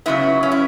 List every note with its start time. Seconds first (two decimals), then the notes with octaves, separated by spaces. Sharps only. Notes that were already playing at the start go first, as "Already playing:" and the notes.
0.06 F#2 C#3 F#3 B3 E4
0.43 C#4
0.52 E4